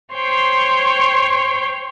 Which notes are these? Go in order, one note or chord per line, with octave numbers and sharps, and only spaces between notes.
C5 C#5 G5 C6